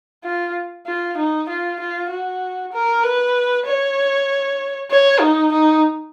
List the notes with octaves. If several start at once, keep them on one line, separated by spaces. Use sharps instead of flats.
F4
F4
D#4
F4
F4
F#4
A#4
B4
C#5
C#5
D#4
D#4